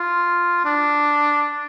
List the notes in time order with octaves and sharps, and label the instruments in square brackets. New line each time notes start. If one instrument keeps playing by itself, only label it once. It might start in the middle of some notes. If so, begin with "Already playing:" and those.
Already playing: [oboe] F4
D4